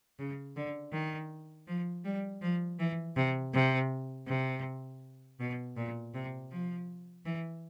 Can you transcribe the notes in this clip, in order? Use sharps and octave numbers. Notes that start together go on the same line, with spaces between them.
C#3
D3
D#3
F3
G3
F3
E3
C3
C3
C3
B2
A#2
C3
F3
E3